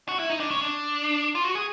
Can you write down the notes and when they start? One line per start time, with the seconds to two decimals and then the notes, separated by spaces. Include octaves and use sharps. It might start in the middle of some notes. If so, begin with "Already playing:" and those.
0.08 F#4
0.19 E4
0.30 D#4
0.40 D4
0.51 C#4
0.62 D4
1.35 F4
1.45 F#4
1.55 G#4